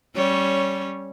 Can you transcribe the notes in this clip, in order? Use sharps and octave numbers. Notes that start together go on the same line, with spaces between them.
G3 C#4 C#5